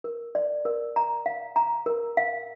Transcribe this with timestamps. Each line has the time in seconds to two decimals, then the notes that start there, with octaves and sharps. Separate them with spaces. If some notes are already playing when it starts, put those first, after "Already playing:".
0.04 A#4
0.35 D5
0.65 A#4
0.96 A#5
1.26 F5
1.56 A#5
1.86 A#4
2.17 F5